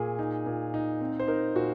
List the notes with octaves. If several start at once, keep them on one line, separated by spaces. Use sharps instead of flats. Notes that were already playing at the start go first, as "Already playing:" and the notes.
Already playing: A#2 G#4
D#4
A#2
D#4
C4
C5
D#4 A#4
A#2 F#4